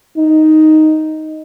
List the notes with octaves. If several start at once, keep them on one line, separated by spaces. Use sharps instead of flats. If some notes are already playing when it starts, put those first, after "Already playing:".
D#4